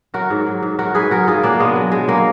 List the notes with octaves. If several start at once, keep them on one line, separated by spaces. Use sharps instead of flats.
F#3 F#4 A#4
G#2
F#3
G#2
F#3 F#4 A#4
G#2 G#4 B4
F#3 F#4 A#4
G#2 F4 G#4
F#3 A#3 D4
B2 G#3 B3
F#3
B2 G#3
F#3 A#3